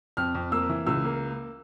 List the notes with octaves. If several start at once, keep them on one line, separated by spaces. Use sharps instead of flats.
F2 F6
F2
A#3 E6
E3
C#2 E6
A#3